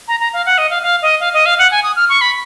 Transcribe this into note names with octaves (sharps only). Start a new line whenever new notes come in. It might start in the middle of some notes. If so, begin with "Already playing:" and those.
A#5
A#5
F5
F#5
D#5
F5
F5
D#5
F5
D#5
F5
F#5
G#5
D#6
F6
C#6
B5